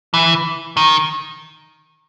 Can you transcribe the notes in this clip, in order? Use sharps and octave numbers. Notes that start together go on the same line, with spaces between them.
E3
D#3